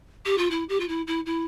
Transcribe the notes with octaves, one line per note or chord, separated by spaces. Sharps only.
G4
F4
E4
G4
F4
E4
E4
E4